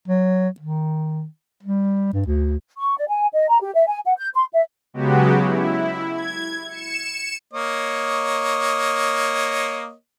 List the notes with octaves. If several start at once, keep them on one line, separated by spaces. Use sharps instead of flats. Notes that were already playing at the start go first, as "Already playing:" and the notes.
F#3
D#3
G3
G2
D2
C#6
D5
G#5
D#5
A#5
G4
E5
G#5
F#5
G6
C6
E5
C#3 F#3 G#3 B3 F#4 G4
E4
G#6
C#7 E7
A#3 C#5 D#5